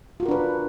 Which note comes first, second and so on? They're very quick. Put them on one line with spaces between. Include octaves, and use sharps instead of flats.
F4 F#4 A#4 D4 B4